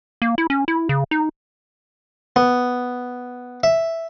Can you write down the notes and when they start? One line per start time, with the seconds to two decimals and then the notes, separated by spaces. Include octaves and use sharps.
0.22 A#3
0.38 E4
0.50 C#4
0.68 E4
0.89 C#3
1.11 D#4
2.36 B3
3.63 E5